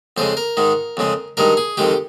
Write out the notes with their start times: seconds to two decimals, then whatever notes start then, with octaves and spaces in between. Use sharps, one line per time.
0.17 F2 C#3 G#3 C5
0.37 A#4
0.57 G#2 D#3 G#3
0.97 F2 C#3 G#3
1.37 G2 D#3 G#3 A#4
1.57 G#4
1.77 F2 D#3 G#3 G4